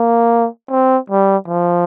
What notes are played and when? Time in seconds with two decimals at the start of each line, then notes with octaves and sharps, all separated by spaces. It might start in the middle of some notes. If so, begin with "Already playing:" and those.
Already playing: A#3
0.71 C4
1.10 G3
1.48 F3